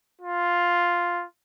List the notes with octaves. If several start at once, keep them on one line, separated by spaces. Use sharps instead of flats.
F4